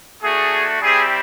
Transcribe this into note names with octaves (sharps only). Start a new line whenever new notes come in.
A3 D4 F#4 G#4
G3 C4 E4 G#4